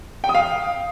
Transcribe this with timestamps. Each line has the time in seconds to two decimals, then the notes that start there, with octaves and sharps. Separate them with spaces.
0.24 G5
0.29 D#6
0.35 F5